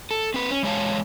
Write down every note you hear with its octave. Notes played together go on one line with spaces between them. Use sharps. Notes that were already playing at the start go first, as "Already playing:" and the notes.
A4
C4 B4
C#4
E2 G#3 C#5 F5 A5